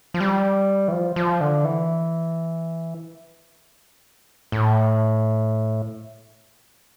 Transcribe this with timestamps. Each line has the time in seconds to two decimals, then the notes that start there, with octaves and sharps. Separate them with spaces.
0.14 F3
0.20 G3
0.88 E3
0.92 F3
1.16 F3
1.41 D3
1.65 E3
4.52 A2